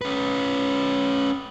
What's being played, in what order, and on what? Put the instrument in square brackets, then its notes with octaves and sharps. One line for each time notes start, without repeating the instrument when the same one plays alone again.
[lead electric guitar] C#4 B4